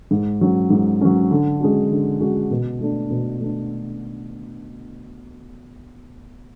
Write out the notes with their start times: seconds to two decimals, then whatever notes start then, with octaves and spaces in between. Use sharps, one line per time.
0.11 G#2
0.41 F#3 C#4
0.70 G#2
1.01 F#3 C#4
1.31 D3
1.60 G#3 C#4 F#4
1.91 D3
2.20 G#3 C#4 F#4
2.51 B2
2.81 A3 D4
3.10 B2
3.40 A3 D4